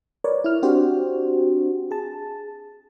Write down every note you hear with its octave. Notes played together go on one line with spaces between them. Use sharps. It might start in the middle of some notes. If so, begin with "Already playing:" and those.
A#4 B4 C#5 D5
E4 F6
C4 D4 F#4 G4 C5
G#4 A5